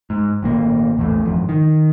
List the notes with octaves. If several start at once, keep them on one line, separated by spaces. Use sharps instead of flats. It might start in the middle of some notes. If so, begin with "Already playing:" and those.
G#2
G#1 A#2 A#3
A#1 E2 A2
G#1 F2
D#3